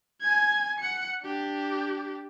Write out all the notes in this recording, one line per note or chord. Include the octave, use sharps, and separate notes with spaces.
G#5 G#6
F#5 C#7
D4 G4